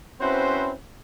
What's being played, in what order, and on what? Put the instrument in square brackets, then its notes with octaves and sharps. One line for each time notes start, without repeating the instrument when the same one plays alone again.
[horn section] C4 C#4 E4 F#4 B4 C5